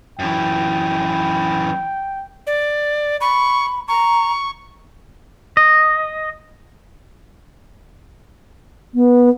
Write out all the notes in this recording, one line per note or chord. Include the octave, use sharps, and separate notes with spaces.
F#2 E3 G5
D5
B5 C#6
A#5 C#6
D#5
B3